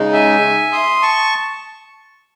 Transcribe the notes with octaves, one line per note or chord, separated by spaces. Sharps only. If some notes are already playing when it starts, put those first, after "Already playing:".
Already playing: C#3 G#3 D#4
E5 G#5
C6 D#6
A5 C#6